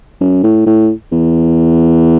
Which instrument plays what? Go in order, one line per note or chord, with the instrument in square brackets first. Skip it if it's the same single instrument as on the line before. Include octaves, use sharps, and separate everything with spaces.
[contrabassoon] F#2
A2
A2
E2